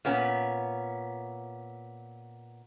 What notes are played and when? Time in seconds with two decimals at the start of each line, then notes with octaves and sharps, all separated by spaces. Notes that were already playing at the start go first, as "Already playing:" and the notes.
0.05 A#2 B3 C#4